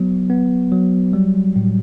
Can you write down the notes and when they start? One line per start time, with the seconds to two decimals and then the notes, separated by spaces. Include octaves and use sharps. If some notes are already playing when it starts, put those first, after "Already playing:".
Already playing: F#3 B3
0.30 B3
0.72 F#3
1.13 G3
1.56 A2